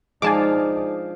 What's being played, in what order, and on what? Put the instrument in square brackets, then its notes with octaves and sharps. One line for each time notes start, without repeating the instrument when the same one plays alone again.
[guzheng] F3 F5 [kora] G#3 D4 [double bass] D#4 [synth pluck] G#5 A5 D6